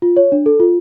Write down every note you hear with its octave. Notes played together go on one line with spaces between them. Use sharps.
F4
C#5
D4
A4
F4